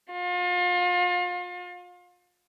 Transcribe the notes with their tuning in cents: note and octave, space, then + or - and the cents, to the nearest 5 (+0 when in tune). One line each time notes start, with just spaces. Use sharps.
F4 +35